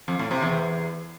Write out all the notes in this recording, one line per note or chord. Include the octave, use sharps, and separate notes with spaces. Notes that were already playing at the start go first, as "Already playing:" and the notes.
F2
A2
C3
E2